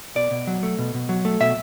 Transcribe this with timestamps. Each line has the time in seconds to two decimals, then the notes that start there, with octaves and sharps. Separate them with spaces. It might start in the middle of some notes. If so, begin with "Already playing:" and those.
0.15 B2 D5
0.31 B2
0.47 F#3
0.63 A3
0.78 B2
0.94 B2
1.09 F#3
1.25 A3
1.40 B2 E5